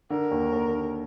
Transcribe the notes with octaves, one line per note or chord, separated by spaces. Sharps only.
D3 A#4
D#2
D#2
D3